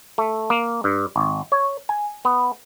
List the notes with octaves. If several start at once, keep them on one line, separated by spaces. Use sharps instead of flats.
A3
A#3
G2
G#1
C#5
G#5
B3